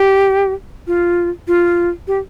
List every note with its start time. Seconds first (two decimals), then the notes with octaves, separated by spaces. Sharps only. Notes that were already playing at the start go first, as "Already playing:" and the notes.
Already playing: G4
0.87 F4
1.48 F4
2.07 G4